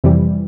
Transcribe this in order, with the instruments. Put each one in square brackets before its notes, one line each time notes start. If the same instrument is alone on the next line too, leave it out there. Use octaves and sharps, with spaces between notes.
[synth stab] F2 C3 E3 G3